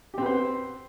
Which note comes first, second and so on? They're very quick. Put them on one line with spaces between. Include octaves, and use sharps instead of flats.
G4 C4 B4 C5